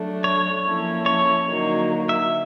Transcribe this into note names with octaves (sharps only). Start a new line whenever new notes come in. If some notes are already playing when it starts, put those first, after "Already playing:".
Already playing: F#3 A3 D4
C#5
F3 A#3 C#4 E4 A4
C#5
D3 F#3 A#3 D#4
E5